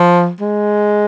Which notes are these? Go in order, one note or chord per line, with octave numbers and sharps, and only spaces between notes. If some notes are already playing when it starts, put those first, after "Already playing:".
Already playing: F3
G#3